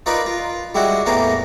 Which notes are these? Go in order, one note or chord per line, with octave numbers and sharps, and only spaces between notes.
D#4 F4 A#4 B4 D5
F4
G3 G#3 E4 F#4
E2 A2 E3 A#3 A#4